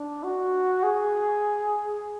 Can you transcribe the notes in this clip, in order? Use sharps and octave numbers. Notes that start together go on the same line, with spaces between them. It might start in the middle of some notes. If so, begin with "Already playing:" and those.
Already playing: D4
F#4
G#4